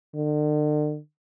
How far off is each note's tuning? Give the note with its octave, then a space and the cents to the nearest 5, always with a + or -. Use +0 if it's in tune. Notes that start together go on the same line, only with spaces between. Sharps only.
D3 +40